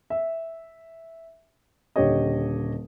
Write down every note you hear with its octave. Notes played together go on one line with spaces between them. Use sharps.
E5
D#1 D3 G4 C#5 D#5